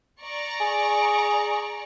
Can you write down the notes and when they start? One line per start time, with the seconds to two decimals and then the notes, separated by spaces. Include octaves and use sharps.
0.21 D5 A#5 C#6
0.61 G#4